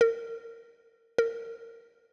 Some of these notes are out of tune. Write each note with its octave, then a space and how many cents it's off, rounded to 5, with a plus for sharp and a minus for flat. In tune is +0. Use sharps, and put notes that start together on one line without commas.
A#4 -30
A#4 -25